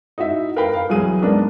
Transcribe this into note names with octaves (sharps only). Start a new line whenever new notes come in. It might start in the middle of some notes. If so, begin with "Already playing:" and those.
D#4 E4 F#4 E5
A#4 B4 F5 G5 B5
A#4 F5
C2 E3 F#3 G#4 D#7
G#2 B3 D4 A#4